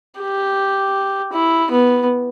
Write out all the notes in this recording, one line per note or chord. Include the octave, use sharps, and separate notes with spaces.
G4
E4
B3